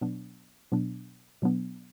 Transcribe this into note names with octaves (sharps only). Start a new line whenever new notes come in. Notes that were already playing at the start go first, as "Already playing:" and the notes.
B2 F#3 B3 D4
B2 F#3 B3 D4
B2 F#3 B3 D4